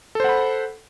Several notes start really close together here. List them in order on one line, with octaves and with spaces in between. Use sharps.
A4 C5 F#5 B5